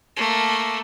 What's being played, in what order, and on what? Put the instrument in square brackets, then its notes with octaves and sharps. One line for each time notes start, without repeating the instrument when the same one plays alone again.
[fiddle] A3 A#3